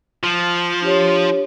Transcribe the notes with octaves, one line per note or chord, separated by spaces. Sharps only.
F3
D4 G4 C#5